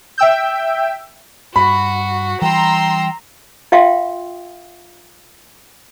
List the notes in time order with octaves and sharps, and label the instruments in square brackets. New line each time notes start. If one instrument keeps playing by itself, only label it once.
[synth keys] E5 G5 E6 G6
[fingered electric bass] G2 [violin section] F#4 [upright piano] B5
[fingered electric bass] E3 G3 [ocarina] G5 [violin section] A#5 C6 E6
[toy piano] F4 E5 F5 G5 C6